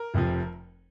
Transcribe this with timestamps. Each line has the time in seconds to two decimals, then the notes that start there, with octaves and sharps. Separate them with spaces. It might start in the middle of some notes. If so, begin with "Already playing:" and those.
Already playing: A#4
0.14 F1 F2 C3 F3